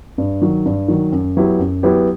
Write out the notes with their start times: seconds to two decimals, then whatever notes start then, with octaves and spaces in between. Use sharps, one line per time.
0.18 G2
0.42 D#3 F#3
0.65 G2
0.88 D#3 F#3
1.12 F#2
1.37 F#3 B3 E4 G4
1.59 F#2
1.83 F#3 B3 E4 G4